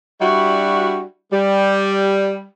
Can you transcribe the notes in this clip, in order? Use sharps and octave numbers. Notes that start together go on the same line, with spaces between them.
G3 D4 E4 F#4
G3